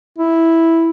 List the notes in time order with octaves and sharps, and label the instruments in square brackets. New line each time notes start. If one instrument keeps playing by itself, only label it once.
[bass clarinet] E4